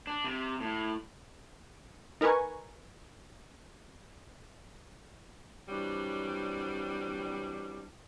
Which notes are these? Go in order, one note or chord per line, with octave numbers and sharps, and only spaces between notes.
D4
C3
A2
D#4 A#4 B4 G#5 C#6
E3 F#3 G3 C4 D4